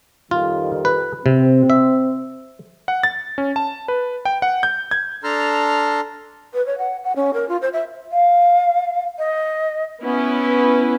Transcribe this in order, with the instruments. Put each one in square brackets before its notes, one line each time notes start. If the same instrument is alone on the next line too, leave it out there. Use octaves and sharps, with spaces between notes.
[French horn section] F2 D#3 G3 [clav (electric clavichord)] F4
[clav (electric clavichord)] B4
[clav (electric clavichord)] C3 [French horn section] C4
[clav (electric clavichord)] E5
[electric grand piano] F#5
A6
C#4
A5
B4
G5
F#5
G6
G#6
[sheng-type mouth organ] D4 A4 A5 A#5 C6 F6
[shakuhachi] B4
C#5
F#5
F#5
C#4
A#4
F4
C5
E5
[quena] F5
D#5
[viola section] B3 C#4 E4 B4